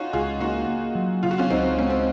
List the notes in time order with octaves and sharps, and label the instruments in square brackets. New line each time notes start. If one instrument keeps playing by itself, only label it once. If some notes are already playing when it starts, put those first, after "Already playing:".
Already playing: [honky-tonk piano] C#4 D#4 F4 F#4
[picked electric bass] C#2 [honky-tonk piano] F4 G#4
[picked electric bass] A#3 [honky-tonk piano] D#4 F#4
[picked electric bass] A#3
F#3
[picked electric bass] C#3 [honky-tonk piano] F4
[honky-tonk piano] F#4
C#4 F4
[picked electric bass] C#2 [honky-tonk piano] C4 D#4
[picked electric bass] G#3 [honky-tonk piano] C#4
[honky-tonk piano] C4